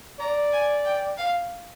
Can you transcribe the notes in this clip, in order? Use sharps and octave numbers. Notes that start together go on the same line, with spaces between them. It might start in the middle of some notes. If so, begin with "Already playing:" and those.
D5 A#5
G#5
G5
F5